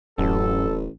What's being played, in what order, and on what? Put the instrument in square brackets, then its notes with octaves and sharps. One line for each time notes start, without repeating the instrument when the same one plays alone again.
[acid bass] D1 [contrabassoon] A1 [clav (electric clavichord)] F#2 [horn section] A4